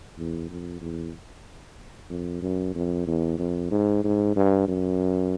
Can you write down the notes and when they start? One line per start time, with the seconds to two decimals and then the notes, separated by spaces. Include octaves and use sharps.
0.18 E2
0.50 F2
0.81 E2
2.10 F2
2.42 F#2
2.75 F2
3.07 E2
3.39 F2
3.71 G#2
4.04 G#2
4.36 G2
4.68 F#2